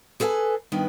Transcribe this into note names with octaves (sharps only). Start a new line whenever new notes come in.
G#4 A4 B4 F5 G#5
G2 D#3 B3